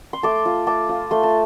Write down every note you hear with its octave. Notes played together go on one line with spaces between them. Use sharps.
C6
A3 A5 D6
F4
A3 A5 D6
F4
A3 C6
A5